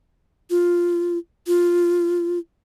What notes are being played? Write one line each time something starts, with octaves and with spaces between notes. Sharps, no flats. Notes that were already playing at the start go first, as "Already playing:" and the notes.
F4
F4